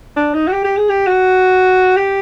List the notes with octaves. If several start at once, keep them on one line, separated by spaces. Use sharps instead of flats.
D4
D#4
F#4
G4
G4
G#4
G4
F#4
G4